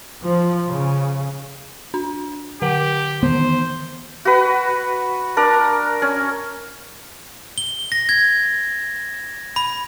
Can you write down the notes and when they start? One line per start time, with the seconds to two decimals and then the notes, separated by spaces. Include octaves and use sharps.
0.24 F3
0.68 C#3
1.94 D4
2.62 D3 G4 F#5 F#7
3.23 D#3 E3 B3 C5
4.25 F#4 B4
5.37 D4 A#4
6.02 C#4
7.58 G7
7.92 A#6
8.09 G#6
9.56 B5